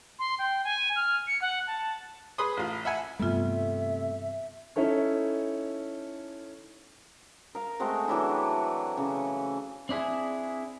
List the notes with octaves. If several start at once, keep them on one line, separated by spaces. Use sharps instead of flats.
C6
G5
G#5
F6
C#7
F#5
A5
G#4 B4 B5 C6 D#6
A1 F4
E5 F#5 G#5
G2 C3 E3 A3 B3 F4 E5
C#4 D#4 E4 A4 C#5
A#4 F5
G#3 A3 C4 F#4
E3 F#3 D4 E4
C#3
C4 D4 E4 G#4